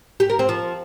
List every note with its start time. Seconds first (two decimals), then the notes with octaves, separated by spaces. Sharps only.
0.20 G4
0.30 A#4
0.39 C4
0.49 F3